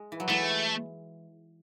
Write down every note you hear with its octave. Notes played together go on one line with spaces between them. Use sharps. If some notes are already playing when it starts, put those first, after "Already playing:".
Already playing: G#3
E3
F#3
E3 G#3 A3